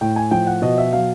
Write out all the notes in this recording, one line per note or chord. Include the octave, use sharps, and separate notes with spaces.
A2 G5
G#5
F3 G5
F#5
B2 D#5
E5
F#3 F5